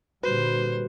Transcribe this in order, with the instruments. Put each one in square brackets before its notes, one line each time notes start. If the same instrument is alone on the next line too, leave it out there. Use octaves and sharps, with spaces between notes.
[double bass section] A#2 D3 G3 [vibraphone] F#4 [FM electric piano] B4 [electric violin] C5